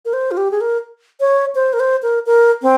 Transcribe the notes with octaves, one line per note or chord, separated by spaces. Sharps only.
A#4
C5
F4
G4
G#4
A#4
C#5
C5
A#4
C5
A#4
A#4
C4